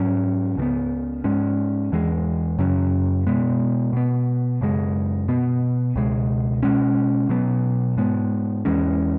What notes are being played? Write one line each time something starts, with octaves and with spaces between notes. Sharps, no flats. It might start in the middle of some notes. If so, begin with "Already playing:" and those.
Already playing: G#2 F#3 C#4
C#2 C#3 E3 B3
G#2 G#3 C#4
E2 E3 G#3
F#2 C#3 F#3 C#4
B2 G#3 B3
B2 B3
F#2 C#3 G#3
B2 B3
C#2 B2 G#3
B2 G#3 C#4
B2 F#3 B3
G#2 G#3 B3
E2 E3 G#3 C#4